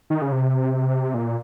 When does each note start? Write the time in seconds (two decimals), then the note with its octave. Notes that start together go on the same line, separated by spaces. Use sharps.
0.10 D#3
0.22 C#3
0.32 C3
1.14 A#2